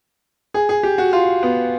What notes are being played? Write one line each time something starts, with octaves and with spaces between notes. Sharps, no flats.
G#4
G#4
G4
F#4
F4
B3